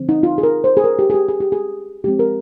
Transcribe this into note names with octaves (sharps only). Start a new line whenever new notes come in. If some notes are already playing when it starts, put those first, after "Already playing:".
Already playing: D3 F3 C4
D#4
F4
G#4
A#4
C5
G#4
A#4
G4
G#4
G4
G#4
G4
G#4
F3 G#3 C4 G4
A#4